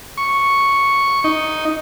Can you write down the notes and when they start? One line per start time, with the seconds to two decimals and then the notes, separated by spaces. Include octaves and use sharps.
0.18 C#6
1.24 D#4